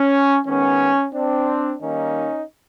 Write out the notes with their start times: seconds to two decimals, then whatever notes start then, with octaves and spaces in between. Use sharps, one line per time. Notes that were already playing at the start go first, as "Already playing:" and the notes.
Already playing: C#4
0.45 D#3 G#3 B3 C#4
1.13 C4 D4
1.81 D#3 G3 A#3 C#4 D#4